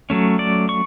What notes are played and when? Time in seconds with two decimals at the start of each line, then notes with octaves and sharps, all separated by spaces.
0.10 F#3 A3 C#4
0.39 D5
0.69 C#6